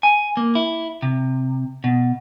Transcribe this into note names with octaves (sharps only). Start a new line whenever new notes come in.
G#5
A#3
E4
C3
B2